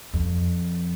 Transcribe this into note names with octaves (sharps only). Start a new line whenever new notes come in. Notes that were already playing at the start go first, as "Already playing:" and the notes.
F2